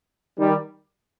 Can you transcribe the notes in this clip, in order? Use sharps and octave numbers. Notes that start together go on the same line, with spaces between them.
D#3 G3